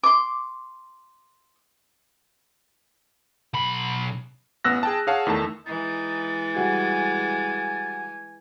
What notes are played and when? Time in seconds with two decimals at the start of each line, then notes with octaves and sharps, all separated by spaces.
0.03 C6 D6
3.54 B1 B5
4.64 A1 B3 E6 F#6 A#6
4.83 G#4 G5 A5
5.07 G#4 C#5 F5 F#5 A5
5.27 E2 D#3 A3 A5
5.66 E3 G#3 D#4 A6
6.55 G3 F#4 G#4 G#5